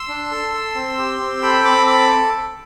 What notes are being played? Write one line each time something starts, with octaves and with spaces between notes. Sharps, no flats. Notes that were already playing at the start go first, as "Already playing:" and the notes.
Already playing: C6 E6
D4
A4
A4
C4
G4
C4
A4 G5 B5
C4 B5 D6
A4 B5 D6